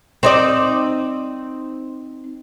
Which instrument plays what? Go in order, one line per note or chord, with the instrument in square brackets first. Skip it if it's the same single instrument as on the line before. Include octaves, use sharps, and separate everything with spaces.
[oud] C4 D#4 D5